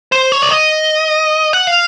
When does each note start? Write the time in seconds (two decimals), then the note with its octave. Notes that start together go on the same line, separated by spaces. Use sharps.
0.12 C5
0.32 C#5
0.42 D5
0.51 D#5
1.53 F#5
1.67 F5